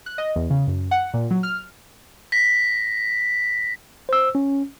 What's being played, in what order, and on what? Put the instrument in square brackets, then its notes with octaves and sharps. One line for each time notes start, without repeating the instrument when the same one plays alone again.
[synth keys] F#6
D#5
E2
C#3
F#2
F#5
A#2
F#3
F6
[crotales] A#6 B6
[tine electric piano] C5 E6
C#4